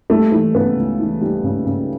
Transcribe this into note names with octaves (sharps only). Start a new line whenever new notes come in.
G3 A3
E3
C#3 B3
C#2
E3
G3
C#3
C#3